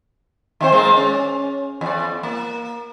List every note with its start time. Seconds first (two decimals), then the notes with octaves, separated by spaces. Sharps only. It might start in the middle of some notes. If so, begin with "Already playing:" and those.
0.61 D#3 C4 C5
0.72 G#3 A#3
0.97 C#4
1.81 E2 D5
2.23 A#3